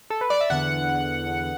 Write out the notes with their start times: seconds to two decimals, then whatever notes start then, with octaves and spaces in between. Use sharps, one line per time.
0.10 A4
0.21 B4
0.30 D5
0.41 E5
0.50 E2 D3 B3 F#5